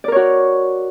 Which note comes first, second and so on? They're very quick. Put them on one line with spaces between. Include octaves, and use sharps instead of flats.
D5 A#4 C#5 F#4